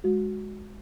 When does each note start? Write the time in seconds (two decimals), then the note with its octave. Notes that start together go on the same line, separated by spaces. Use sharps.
0.04 G#3 F#4